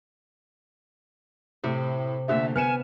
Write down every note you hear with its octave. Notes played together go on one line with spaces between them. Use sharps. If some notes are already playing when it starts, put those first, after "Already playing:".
A2 C3
A#2 D3 A3 E5
B3 G#5 F6 C#7 E7